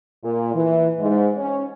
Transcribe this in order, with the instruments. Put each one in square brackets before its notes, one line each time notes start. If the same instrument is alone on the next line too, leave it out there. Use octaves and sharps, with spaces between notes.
[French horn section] A#2
E3
G#2
C#4